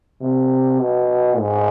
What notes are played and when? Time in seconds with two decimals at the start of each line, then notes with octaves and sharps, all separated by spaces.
0.21 C3
0.80 B2
1.38 G#2